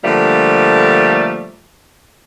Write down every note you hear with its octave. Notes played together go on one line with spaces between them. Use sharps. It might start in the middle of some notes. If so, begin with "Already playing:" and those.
D3 F3 G3 A3 A#3